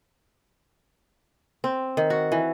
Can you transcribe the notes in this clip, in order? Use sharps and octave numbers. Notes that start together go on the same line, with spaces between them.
C4
D#3
F#4
E3